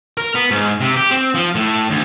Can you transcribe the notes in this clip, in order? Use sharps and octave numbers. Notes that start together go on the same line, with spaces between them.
A#4
B3
G#2
C3
G4
C4
F3
A2
D2